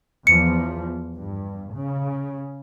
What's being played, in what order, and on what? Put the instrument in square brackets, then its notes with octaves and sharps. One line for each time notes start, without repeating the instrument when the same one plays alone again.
[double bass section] E2 F3 [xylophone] C#7
[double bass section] G2
C#3